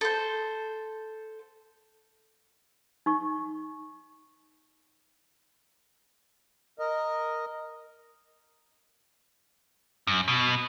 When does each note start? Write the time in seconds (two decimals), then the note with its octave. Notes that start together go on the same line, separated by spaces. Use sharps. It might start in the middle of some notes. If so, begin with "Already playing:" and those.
0.01 A4 C5
3.06 D#4 C#6
6.79 A#4 D#5
10.07 F#2
10.28 B2